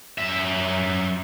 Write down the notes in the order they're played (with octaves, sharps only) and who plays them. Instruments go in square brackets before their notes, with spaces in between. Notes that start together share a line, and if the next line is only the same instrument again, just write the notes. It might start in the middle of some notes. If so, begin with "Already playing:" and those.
[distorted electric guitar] F#2 E5